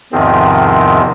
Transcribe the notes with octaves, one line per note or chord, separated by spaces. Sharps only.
E2 G#2 C3 D#3 F3 C4